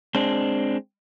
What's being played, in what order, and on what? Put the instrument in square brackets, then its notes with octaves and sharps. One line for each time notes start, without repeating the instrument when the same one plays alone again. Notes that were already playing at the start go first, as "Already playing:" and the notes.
[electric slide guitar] G#3 C4 D4